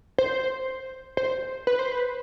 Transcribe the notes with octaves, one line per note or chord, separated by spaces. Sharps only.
C5
C5
B4
C5
B4